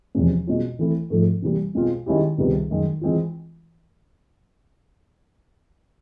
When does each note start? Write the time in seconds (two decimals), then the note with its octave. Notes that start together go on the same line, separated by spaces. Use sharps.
0.15 E2 C3 F3 G#3 C#4
0.47 B2 G#3 C#4 F4
0.79 E3 A3 C4 E4
1.10 G#2 F3 A3
1.42 C3 E3 G3 A#3
1.75 B2 G#3 C4 F4 G#4
2.06 D#3 G#3 C#4 E4 G4
2.38 C#2 C3 D#3 G3 B3
2.70 F#2 D#3 G#3
3.01 E3 G#3 C4 F4